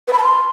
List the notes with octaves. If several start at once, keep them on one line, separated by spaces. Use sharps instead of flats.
B4
B5
A5
C6